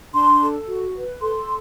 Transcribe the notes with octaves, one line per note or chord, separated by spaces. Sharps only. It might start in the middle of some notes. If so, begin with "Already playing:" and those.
D4 C6
A4
F#4
B4
A4 C6